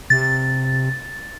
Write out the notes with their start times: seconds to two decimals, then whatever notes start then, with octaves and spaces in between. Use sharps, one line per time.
0.10 C3 A6